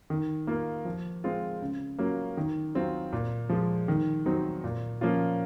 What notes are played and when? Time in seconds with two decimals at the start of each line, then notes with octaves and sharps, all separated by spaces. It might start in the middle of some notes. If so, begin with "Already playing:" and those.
0.10 D#3
0.47 A#3 F4
0.85 F3
1.24 G#3 C4 F4
1.61 C#3
1.99 F#3 A#3 C#4 F4
2.37 D#3
2.75 F#3 C4 F4
3.12 A#2
3.49 F3 G#3
3.88 D#3
4.26 F#3 C4 D#4
4.64 A#2
5.01 F3 A#3 C#4 F4